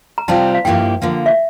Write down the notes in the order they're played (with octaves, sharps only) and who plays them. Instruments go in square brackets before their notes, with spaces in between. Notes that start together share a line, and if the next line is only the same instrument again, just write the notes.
[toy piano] A#5
[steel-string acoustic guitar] C3 G3 C4 F4 [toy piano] A5
[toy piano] F5
[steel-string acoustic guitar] G2 F3 A#3 E4 G4 [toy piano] G5
[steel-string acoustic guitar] D3 F3 A#3
[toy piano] E5